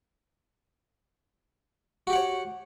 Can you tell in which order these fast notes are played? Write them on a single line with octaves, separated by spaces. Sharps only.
F#4 G4 F#5 C#5